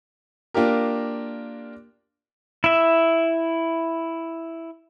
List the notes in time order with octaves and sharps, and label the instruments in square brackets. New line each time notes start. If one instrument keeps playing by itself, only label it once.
[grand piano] A#3 D4 F4 G4 A#4
[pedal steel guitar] E4 E5